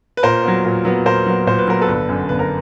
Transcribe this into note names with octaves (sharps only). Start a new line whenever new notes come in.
B4
A#2 A#4 C5
F#3 B3
A#2
F#3 B3
A#2 A#4 C5
F#3 B3
A#2 C5
B4
F#3 B3 A#4
A4 B4
G1
F#2 D3
G1 B4
A#4